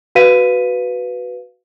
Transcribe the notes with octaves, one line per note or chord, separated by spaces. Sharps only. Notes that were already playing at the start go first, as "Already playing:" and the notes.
F#4 B4 F5 B6 D#7